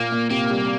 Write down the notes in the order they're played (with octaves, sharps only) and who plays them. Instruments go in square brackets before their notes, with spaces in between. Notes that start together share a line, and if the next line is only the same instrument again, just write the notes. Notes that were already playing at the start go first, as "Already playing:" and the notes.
Already playing: [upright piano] A#2 [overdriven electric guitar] A#3
[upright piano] A#2
[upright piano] C3 [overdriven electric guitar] A#3
[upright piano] G3